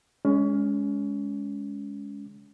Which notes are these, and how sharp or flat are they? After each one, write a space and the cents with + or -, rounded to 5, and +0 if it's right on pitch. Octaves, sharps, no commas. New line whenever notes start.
G#3 +0 C#4 +25